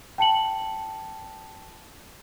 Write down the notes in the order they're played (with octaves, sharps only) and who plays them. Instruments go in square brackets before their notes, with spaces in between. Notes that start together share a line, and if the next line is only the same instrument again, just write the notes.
[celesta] G5 A5 C#7 F#7